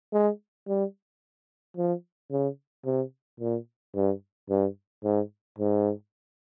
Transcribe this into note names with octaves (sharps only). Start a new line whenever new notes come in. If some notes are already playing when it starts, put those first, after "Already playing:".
G#3
G3
F3
C#3
C3
A#2
G2
G2
G#2
G#2